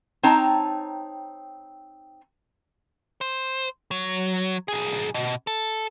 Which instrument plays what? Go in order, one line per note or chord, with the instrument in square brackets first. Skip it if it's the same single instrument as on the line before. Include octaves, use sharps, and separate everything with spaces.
[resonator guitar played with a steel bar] C4 D#4 C#5 G5 A5 A#5
[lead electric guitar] C5
F#3
B1 G#4
B2
A4